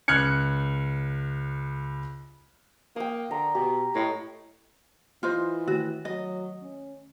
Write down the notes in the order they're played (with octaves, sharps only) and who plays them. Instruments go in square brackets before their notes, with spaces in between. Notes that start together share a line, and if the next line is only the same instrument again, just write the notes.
[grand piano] C#2 F6 F#6 G#6 C#7
[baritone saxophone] A#3 [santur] G5 D#6
[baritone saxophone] D3 [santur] A#5
[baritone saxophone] B2 [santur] G4
[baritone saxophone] A2 [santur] D#5 G5
[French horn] E3 [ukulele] F4 C5 D#5
[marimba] D#3 A3 [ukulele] F#4
[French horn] F#3 [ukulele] D#5
[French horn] C#4